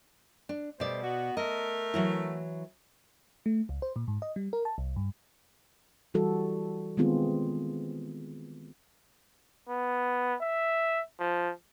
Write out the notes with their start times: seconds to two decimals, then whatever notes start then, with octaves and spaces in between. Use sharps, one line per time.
0.49 D4
0.80 B2 G3 A3 C5 D5
1.03 B3 F#4
1.37 A3 A#4 D#5
1.94 E3 F#3 E4
3.46 A3
3.69 C#2
3.82 C5
3.96 A#2
4.08 G#2
4.22 D#5
4.36 G3
4.53 A#4
4.65 A5
4.78 C2
4.96 G2
6.14 E3 G3 F#4 A4
6.97 D#3 G#3 B3 C4 F4 G#4
9.69 B3
10.42 E5
11.20 F3